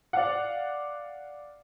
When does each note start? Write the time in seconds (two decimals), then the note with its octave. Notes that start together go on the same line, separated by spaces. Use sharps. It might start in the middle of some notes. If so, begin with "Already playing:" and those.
0.13 D5 F5 F#5